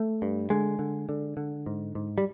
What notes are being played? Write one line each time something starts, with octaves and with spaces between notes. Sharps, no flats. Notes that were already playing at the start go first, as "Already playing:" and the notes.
Already playing: A3
G2
D3 G#3
D3
D3
D3
G#2
G#2
G3